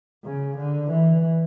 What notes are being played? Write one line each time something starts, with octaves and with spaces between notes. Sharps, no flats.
C#3
D3
E3